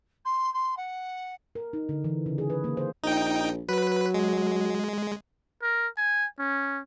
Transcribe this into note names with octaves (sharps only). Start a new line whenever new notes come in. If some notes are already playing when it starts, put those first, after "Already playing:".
C6
C6
F#5
A#4
D#4
D3
E3
C#3
G#4
B4
A#3
C5
A#1 D#4 G5
F#3 B4
G#3
A#4
G#5
C#4